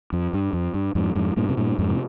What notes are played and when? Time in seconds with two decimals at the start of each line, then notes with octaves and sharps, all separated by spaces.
0.13 F2
0.33 G2
0.53 F2
0.74 G2
0.95 F2 G#2
1.15 F2 G#2
1.37 G2 A#2
1.49 C3
1.57 G2 A#2
1.79 F2 G#2
1.89 C3